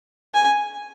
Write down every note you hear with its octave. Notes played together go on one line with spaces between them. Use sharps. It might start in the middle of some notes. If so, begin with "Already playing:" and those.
G#5